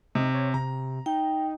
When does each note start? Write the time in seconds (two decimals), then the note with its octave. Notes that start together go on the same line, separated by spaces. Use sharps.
0.15 C3 D#4
0.34 C#5
0.54 C3 A#5
1.06 D#4 G5